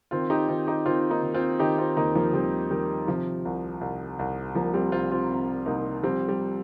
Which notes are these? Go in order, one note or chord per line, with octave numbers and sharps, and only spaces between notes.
D#3 C4 F4
D#4 G4
D#3 C4 F4
D#4 G4
D#3 C4 F4
A#3 D#4
D#3
C4 F4
D#3 D#4 G4
C4 F4
D#2 A#3 D#4
F3 A#3
D#2 G3 C4
D#3 G3
C3 F3
C2
C2
C2
C2 F3 A#3
G3 C4
C2 C4 F4
C4 F4
C3
C2 A#3 D#4
F3 G3 C4
G3